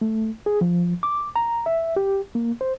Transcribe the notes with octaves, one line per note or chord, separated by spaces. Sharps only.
A3
G#4
F3
D6
A#5
E5
G4
A#3
C5